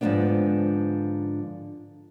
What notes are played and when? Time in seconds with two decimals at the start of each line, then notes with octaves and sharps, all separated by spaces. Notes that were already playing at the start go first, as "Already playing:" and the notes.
0.01 G#2 D3 F3 G3 B3 D4